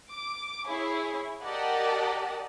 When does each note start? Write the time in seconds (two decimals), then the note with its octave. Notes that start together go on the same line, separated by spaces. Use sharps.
0.10 D6
0.66 E4 G#4 C#5
1.43 G4 A#4 D5 D#5 F#5 A5